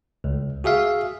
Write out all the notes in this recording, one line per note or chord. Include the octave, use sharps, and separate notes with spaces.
C#2
F#4 G#4 E5 F5